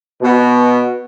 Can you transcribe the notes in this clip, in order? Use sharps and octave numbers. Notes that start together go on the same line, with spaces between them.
B2